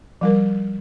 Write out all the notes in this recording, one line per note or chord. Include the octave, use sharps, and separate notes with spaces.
F3 G3 A#4